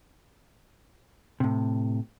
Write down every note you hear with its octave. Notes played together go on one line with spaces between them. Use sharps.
A2 C3